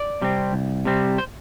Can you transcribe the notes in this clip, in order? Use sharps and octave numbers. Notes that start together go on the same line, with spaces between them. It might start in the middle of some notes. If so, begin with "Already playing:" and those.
Already playing: D5
C3 G3 C4
C2
C3 G3 C4
C5